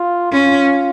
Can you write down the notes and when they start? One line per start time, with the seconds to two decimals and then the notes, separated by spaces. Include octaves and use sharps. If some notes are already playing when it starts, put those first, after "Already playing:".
Already playing: F4
0.32 C#4 F4